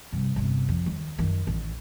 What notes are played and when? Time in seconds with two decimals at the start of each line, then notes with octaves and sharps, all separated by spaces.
0.13 G2 C3
0.36 G1 C3
0.69 F2
0.86 D#2
1.18 F#2 D#3
1.47 A1